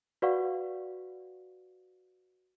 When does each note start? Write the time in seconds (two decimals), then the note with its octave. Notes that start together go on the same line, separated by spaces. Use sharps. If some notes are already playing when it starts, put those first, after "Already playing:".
0.22 F#4 B4 D5 F5 F#5 C#6